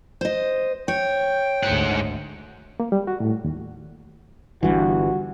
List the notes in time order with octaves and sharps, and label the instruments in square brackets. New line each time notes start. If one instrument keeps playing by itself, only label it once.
[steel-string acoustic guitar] C5 D#5
[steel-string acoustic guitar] C#5 [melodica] G5
[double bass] G#1 D2 [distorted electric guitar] G#2 F#5
[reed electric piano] A#3
G3
F#4
A2
D#2
[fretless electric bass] G1 G2 E3 [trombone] F#4